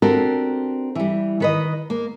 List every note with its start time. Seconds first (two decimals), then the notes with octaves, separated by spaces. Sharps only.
0.02 C4 D4 F#4 G4 A4 A#4
0.95 E3 G3
1.40 D#3 B4 D#5
1.90 A#3